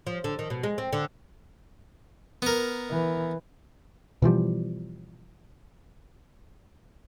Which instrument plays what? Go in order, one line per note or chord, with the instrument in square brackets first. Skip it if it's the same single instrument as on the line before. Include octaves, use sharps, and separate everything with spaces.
[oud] F3
D3
D#3
B2
G#3
C4
D3
[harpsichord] B3 A#4
[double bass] E3
[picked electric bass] B2 E3 F3 G3